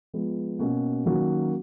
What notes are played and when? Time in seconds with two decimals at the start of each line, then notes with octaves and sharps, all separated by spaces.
0.14 F3 G#3 B3
0.59 B2 A#3 C#4 F#4
1.05 D#3 F#3 A#3 C#4 F#4